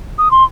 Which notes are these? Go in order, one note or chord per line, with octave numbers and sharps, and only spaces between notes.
D#6
C6